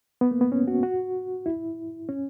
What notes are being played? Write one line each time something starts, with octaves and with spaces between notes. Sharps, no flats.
B3
A#3
B3
C#4
F#4
F#4
E4
C#4